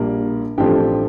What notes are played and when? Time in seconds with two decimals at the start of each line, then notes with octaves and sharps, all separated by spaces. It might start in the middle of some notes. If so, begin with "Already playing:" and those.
Already playing: A#1 A#2 G3 A#3
0.58 A1 G2 F3 A3 C4 G4 G5